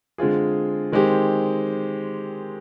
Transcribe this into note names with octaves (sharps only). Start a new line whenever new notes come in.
D3 G#3 C4 F4 G#4
D#3 G#3 C4 G4